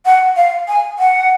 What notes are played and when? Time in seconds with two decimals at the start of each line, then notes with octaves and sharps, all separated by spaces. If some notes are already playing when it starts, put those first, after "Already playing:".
0.05 F#5
0.36 F5
0.68 G#5
0.99 F#5